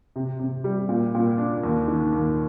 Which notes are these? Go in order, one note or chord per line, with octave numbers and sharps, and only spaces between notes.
C3
C3
G3
A#2
A#2
D4
D#2
D#3
D#2